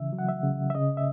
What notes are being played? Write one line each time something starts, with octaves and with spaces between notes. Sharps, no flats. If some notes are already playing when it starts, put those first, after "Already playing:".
Already playing: C#3 E3 E5
F#3
F#5
E5
C#3
E5
C#3 D#5
E5